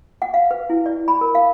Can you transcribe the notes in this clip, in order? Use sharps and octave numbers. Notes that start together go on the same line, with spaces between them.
F#5
F5
B4
E4
D5
B5
A#4
F5